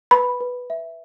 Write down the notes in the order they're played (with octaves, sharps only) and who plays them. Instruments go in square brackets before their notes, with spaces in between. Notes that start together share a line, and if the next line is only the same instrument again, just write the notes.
[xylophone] B4 B5
B4
E5